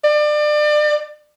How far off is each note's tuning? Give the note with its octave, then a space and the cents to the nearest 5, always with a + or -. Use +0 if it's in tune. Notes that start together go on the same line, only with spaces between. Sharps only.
D5 +30